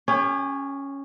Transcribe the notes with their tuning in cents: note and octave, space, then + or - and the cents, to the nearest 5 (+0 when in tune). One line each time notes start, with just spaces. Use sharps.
C#4 +0 G4 +40